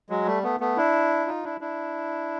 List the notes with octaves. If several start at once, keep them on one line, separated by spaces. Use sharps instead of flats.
F#3 G#3
G3 A3
A3 B3
A3 B3
D4 E4
D#4 F4
D4 E4
D4 E4